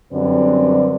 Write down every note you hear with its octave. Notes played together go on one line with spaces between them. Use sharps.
F#2 D3 G3 C4 B4 D5